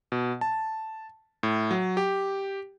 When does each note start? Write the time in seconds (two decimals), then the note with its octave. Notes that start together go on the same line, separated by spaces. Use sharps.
0.12 B2
0.41 A5
1.43 A2
1.71 F#3
1.97 G4